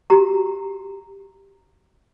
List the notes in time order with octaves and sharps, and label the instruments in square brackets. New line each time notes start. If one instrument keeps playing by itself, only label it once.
[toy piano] F#4 G4 A#5